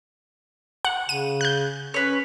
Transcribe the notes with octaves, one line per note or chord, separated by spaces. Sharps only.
F#5
C#3 D#7
F#6 G6
C#4 B4 C#5